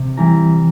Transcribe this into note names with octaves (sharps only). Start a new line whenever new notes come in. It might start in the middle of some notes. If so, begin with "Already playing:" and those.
Already playing: C3
E3 G3 A#5